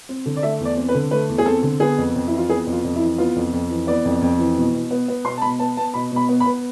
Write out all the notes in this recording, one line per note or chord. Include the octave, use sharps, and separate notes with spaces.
C4
D3
D5
A3 E5
E2
D5
C4
B4
D3
A3 B4
E2
G#4
C4 A4
D3
B3 G#4
F2
F2
E3 E4
F4
B3 G#4
F2
F4
F2
E4
E3
B3 F4
F2
F2
E3
B3 D5
F2
F2
E3
B2
B2
B3
B3
B2 C6
A5
B2 B5
B3 A5
B3 A5
B2 B5
B2 B5
B3
B5
B3